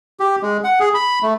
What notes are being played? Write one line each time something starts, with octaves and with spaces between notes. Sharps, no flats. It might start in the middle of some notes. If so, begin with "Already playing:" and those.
G4
G#3
F#5
G#4
B5
A3